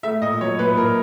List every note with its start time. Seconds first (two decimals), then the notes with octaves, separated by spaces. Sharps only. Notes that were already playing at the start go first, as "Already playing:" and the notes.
0.03 A3 E5
0.22 A#2 D#5
0.41 F#3 C#5
0.59 A#2 B4
0.77 A#2 A#4